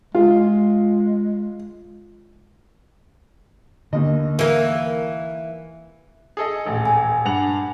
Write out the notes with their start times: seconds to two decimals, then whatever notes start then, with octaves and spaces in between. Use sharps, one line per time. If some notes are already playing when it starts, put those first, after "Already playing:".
0.15 G#3 F4
3.93 D#2 D3 D#5
4.39 E3 A#3
6.37 G#4 A4 D#5
6.65 D#1 A1
6.85 G#5
7.25 G2 F#5 F7